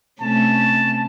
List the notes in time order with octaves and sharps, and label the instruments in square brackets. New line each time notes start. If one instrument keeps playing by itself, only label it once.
[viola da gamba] C3 A3 C#4 [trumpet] A5